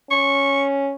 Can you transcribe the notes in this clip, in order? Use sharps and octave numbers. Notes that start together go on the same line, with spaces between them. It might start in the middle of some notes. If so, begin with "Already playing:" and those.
C#4 C#6